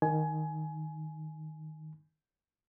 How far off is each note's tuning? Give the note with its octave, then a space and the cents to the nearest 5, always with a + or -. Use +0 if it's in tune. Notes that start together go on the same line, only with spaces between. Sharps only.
D#3 +0 G#5 +20